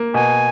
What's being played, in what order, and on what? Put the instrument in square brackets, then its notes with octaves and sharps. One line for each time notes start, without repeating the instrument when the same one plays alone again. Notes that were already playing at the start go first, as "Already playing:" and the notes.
Already playing: [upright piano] A#3
[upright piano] B2 [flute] G#5